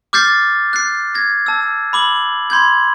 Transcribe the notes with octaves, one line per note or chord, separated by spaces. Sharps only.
D6 F6 G6 A6 C7
F#6 C7
G#6 A#6
A5 E6
B5 D6 F#7
B5 C6 G6 G#6